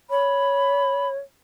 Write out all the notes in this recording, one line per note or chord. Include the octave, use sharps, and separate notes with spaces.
C#5 B5